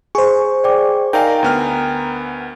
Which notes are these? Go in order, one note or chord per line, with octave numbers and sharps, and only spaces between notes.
G#4 C5 C#6
D5 G5 D6
D#4 A#4 D5 F5 G5 G#5 A#5
D2 B3 F6